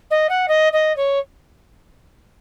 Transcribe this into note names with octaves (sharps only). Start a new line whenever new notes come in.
D#5
F#5
D#5
D#5
C#5